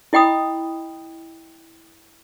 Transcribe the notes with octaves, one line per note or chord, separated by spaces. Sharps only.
E4 D#5 G5 B5 D#6